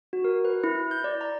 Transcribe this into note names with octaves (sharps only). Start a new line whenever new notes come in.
F#4
A#4
B4
E4
G6
D5
A#5